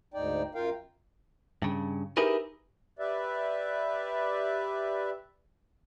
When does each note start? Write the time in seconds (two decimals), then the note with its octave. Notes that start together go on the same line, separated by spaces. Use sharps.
0.14 D2 G#2 D#4 D5 G5
0.55 F#2 F4 A#4 F5 G5
1.62 G2 C#3
2.17 D#4 E4 G4 G#4 A#4 B4
2.99 G4 B4 D5 E5